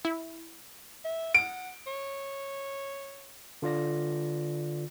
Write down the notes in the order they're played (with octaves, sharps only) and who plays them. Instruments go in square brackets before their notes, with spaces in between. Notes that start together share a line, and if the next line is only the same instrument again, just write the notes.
[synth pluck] E4
[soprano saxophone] E5
[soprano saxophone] F#5 [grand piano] D7
[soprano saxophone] C#5
[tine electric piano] D3 F4 D5 A#6